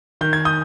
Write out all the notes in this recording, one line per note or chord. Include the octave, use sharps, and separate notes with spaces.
D#3 G6
G#6
D#6 G6